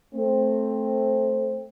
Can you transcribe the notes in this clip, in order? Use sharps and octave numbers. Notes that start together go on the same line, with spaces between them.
A3 C4